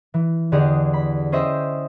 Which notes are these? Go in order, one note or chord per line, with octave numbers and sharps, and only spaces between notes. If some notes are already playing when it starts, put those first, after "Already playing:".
E3
E2 D3 G4 G#4 D#5
B5
C#4 G#4 C5 D#5 E5 G5